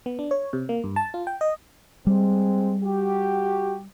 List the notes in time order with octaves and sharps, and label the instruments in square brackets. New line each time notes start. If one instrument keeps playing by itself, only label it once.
[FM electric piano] B3
D4
C#5
C3
A#3
G2
A5
F4
G5
D#5
[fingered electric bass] G3 [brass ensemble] G#3 C4
[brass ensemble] F#4 G4